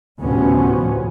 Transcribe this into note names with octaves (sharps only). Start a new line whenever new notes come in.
D2 A2 C3 F3 B3 C#4